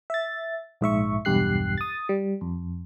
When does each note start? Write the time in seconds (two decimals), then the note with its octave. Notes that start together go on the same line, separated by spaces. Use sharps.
0.10 E5 A6
0.81 A#1 G#2 E5 C#6
1.25 B1 E2 G2 G4 F#6 C7
1.78 D#6 A6
2.09 G3
2.41 F2